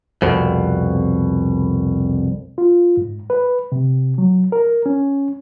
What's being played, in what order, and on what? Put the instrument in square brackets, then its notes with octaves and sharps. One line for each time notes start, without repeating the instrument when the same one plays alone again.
[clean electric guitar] C2 F2 B2
[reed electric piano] F4
G#2
B4
C3
F#3
A#4
C#4